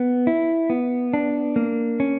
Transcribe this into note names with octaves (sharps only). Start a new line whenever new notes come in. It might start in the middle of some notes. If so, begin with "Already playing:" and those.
Already playing: B3
E4
B3
D4
A#3
C#4